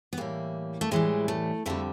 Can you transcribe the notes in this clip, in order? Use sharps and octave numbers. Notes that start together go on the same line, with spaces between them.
B3
A2 E3 G3 A#3
A3
A2 E3 G3 G#3
A3
F2 D3 G3 A3